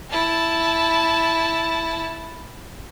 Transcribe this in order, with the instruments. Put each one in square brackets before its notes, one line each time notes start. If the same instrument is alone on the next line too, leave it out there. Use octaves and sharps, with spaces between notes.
[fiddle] E4 A5